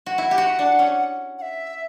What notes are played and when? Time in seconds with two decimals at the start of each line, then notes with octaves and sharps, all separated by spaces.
0.06 F#4
0.18 E4 F#5
0.31 G4
0.38 F#4
0.59 D4
0.79 C#4
1.38 F#5
1.42 E5